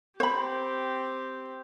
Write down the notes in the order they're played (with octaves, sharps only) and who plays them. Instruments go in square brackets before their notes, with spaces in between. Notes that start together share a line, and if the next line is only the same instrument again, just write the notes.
[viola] C4 G4 [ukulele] C5 B5